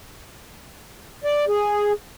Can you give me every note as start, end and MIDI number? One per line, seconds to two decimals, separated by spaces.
1.24 1.45 74
1.48 1.92 68